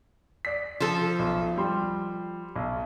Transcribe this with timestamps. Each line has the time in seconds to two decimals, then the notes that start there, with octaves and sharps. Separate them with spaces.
0.45 D5 B6
0.80 F3 A4
1.19 B1
1.58 G3 C6
2.56 B1